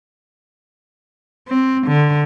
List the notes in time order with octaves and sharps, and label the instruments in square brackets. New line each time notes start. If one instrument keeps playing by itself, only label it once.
[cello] C4
D3